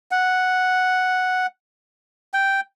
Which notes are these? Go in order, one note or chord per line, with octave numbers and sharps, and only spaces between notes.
F#5
G5